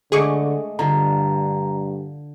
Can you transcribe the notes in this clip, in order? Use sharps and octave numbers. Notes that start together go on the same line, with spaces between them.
D3 G#3 A3 G#4 C#6 D6
G2 D3 F4 A#5